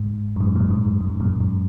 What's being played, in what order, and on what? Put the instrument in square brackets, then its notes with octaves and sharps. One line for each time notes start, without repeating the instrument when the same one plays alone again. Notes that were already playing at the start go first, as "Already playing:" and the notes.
Already playing: [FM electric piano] G#2
F#2
G#2
F#2 A#2
G#2
F#2
G#2
F#2
F#2 A#2
G#2
F#2